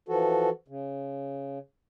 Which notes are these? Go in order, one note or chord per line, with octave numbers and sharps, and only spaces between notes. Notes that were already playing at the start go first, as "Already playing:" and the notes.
E3 F3 F#4 A4
C#3